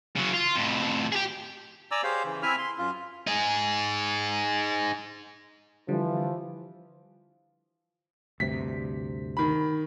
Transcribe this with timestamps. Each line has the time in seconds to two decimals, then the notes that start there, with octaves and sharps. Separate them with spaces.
0.16 C#3 F#3
0.34 F4
0.56 F2 A2
1.12 G4 G#4
1.91 D5 G#5 A#5 D6 E6
2.04 G4 G#4 C5 C#5 F5
2.24 C#3 E3
2.43 C4 E4 E5 G#5 F6
2.58 C6
2.78 F#2 F4
3.27 D#4 G#4
5.88 D3 E3 F3 G3
8.40 D2 G2 C3 B6
9.37 D#3 B5